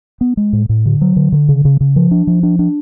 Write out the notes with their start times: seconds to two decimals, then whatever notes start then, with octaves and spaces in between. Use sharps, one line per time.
0.21 B3
0.37 G#3
0.53 A2
0.69 A2
0.85 D3
1.01 F#3
1.16 D3
1.32 D3
1.49 C#3
1.65 C#3
1.81 C#3
1.96 F3
2.11 D4
2.27 F3
2.43 D4
2.59 D4